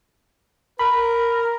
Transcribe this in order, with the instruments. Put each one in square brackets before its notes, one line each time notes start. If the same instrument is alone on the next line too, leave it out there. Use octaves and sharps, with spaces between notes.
[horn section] A#4 [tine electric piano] B5